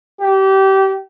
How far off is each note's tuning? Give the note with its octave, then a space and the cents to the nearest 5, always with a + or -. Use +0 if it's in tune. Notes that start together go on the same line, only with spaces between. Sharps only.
G4 -25